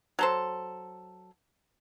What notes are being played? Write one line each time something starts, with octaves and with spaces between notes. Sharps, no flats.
F#3 A4 C5